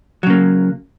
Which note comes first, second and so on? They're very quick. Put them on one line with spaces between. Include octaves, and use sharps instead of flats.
F#3 C#3 A#3